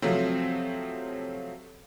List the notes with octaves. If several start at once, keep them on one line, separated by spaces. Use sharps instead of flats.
C3 F3 F#3 A3 C4